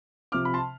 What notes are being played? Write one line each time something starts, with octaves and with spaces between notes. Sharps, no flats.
C3 F3 D6 F6
B5
A5 C6